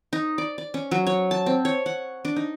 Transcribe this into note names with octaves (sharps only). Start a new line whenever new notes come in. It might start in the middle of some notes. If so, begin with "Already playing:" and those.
D#4
D5
D5
C#4
F#3
C#5
A5
C4
C#5
F#5
D4
D#4